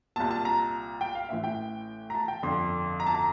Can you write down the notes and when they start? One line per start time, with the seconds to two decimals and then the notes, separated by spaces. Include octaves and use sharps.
0.16 C2 A#2 A5
0.31 A5
0.45 A#5
1.01 G5
1.15 F5
1.29 A1 A2 E3 E5
1.44 G5
2.10 A#5
2.15 A5
2.28 G5
2.43 G1 F2 D3 C6
3.00 A#5
3.07 A5
3.15 A#5